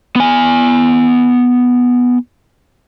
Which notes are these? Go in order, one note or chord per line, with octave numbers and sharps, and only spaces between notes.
B3 G#5